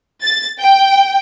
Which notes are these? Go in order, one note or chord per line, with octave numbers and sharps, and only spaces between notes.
A6
G5